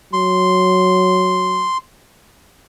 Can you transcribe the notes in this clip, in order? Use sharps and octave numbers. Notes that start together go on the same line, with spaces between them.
F#3 C6